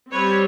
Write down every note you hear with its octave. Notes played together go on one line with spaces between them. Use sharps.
G3 C4 B4 C#5